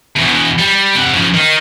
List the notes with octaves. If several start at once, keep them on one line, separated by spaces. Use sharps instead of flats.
E2 B2
G3
C3 F#5
C#3 F3
D#3 D#4